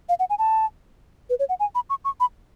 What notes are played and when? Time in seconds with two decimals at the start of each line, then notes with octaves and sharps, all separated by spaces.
0.09 F5
0.20 F#5
0.30 G#5
0.39 A5
1.30 B4
1.39 C#5
1.49 F#5
1.60 G#5
1.75 B5
1.90 C#6
2.05 C#6
2.20 B5